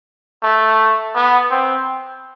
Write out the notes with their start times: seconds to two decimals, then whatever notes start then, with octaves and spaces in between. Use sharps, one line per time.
0.43 A3
1.15 B3
1.50 C4